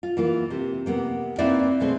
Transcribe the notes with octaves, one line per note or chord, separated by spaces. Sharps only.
F4
E3 A#3 F4
C3
C3 A#3 B3
A#3 C4 D#4 E4 B4 D5
B2 G#3 A3 C4